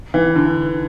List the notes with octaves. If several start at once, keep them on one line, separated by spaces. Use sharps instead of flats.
E3
D3